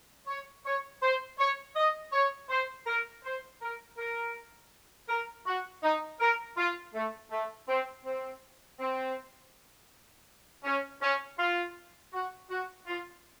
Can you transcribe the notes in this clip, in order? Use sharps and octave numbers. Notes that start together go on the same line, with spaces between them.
C#5
C#5
C5
C#5
D#5
C#5
C5
A#4
C5
A#4
A#4
A#4
F#4
D#4
A#4
F4
A3
A3
C4
C4
C4
C#4
C#4
F4
F#4
F#4
F4